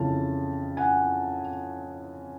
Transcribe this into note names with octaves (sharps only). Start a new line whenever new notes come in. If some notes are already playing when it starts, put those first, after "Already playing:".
Already playing: F2 C#3 E3 A5
F#5 G#5